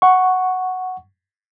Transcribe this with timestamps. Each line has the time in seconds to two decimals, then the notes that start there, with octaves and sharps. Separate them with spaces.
0.02 F#5 C#6